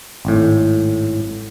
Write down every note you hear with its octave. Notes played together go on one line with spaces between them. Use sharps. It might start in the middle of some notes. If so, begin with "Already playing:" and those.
G#1 A2